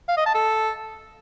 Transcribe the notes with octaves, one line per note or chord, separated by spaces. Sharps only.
F5
D#5
A5
A4